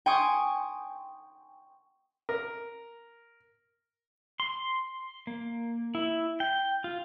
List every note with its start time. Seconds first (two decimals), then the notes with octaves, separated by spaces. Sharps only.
0.06 G5 G#5 C6 C#6 D#6 G#6
2.29 A#4
4.40 C6
5.27 A#3
5.95 E4
6.40 G5
6.84 F4